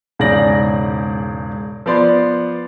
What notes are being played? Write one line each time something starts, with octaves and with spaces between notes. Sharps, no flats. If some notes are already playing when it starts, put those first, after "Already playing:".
E1 G#2 C#3 D5 A#6 F#7
F3 B3 D5 C6